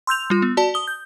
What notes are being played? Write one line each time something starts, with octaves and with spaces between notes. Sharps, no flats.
C6 E6 G6 F7
G3 F4
B3
F#4 D5 A5
D#6 G7
G6